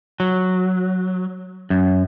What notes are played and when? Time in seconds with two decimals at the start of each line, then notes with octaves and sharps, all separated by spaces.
0.20 F#3
1.70 F#2